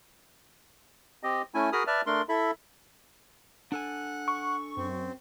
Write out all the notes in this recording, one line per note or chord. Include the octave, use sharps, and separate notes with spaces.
C4 G4 D#5
A3 C#4 E4 G#5
F#4 G#4 A#4 B5 D#6 F6
B4 D5 E5 A5 F6
A3 D4 A#4 C6
E4 A4 E5 B5
D4 A4 F#5 G#5
C#6
F#2 C4